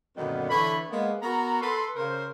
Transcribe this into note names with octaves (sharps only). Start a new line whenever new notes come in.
F#2 A#2 D3 D#3 B3
D3 E3 C#5 B5
G#3 A#3 B3
B3 F#4 A#4 A#5
A4 B4 C6
C#3 A#4 C5